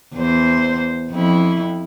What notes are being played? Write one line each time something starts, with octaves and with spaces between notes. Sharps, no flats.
E2 C5
F2 E4